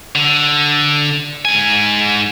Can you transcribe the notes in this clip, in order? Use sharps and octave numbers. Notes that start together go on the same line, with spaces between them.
D3
G#2 G#5